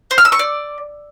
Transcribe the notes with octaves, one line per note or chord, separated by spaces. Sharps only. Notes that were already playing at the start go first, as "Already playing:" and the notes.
C5
F6
E6
C#6
D5